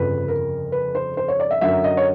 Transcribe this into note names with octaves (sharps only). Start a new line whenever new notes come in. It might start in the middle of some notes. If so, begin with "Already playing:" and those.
Already playing: G1 F2 C#3 F3 B4
A#4
B4
C5
C5
C#5
D5
E5
F#2 D3 F#3 E5
D#5
C#5